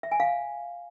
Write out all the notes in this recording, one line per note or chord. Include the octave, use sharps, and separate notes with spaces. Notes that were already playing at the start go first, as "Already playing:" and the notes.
E5
G#5
F5